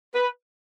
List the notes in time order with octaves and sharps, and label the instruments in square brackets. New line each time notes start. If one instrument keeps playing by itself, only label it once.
[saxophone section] B4